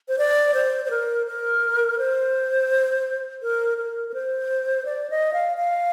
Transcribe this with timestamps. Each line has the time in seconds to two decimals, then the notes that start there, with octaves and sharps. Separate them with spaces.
0.08 C5
0.18 D5
0.54 C5
0.85 C5
0.90 A#4
1.27 A#4
1.98 C5
3.42 A#4
3.78 A#4
4.09 A#4
4.14 C5
4.85 D5
5.10 D#5
5.33 F5
5.57 F5